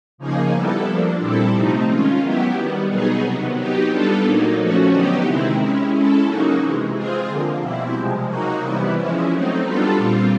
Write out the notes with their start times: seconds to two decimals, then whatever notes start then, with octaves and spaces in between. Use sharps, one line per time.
0.18 C#3 F3 A#3 D#4 G#4
0.52 G3 B3 E4 A4
0.85 F3 A#3 D4
1.20 A#2 G3 C4 E4 A4
1.52 C3 F3 A3 C4 D#4
1.87 D#3 G#3 C#4 F4
2.20 F#3 B3 E4 G4
2.54 D#3 G3 B3
2.88 B2 F#3 B3 D#4 G#4
3.22 C3 D#3 F#3 B3
3.55 F#3 B3 D#4 G4
3.89 G3 B3 D4 F4 A4
4.22 A#2 F#3 A#3 D#4
4.56 F3 A3 C#4 F#4
4.91 D3 F#3 B3 D#4 G4
5.24 C3 D#3 G#3 C4 E4
5.58 G#3 C#4 E4
5.91 G#3 C#4 E4 A4
6.25 C#3 F#3 A#3 D#4 F#4
6.59 C3 E3 G#3
6.92 G#3 C4 F4 G#4
7.26 D3 F3 A#3
7.60 B2 G3 C4 E4
7.95 C3 F3 G#3
8.27 F#3 A#3 D#4 F#4
8.61 C3 E3 G3 B3 E4
8.95 F3 G#3 C#4 E4
9.29 F#3 A3 C4 D#4
9.62 G3 B3 D4 F4 A4
9.97 A#2 G3 C4 F4